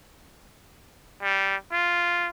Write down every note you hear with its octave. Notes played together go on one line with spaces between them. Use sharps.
G3
F4